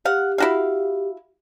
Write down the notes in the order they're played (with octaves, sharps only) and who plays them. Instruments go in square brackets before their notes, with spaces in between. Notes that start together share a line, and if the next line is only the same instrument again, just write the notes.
[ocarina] G4 [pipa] F5 F#5
[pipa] E4 F#4 F5